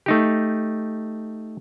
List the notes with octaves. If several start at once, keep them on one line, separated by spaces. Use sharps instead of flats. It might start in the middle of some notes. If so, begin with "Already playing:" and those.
A3 D#4 G4